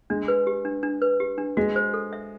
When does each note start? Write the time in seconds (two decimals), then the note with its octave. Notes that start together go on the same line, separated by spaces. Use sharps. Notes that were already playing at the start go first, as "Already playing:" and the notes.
0.10 G#3 D4
0.28 B4
0.47 G4
0.65 D4
0.83 D4
1.02 B4
1.20 G4
1.38 D4
1.57 G#3 F#4
1.76 C5
1.94 A4
2.13 E5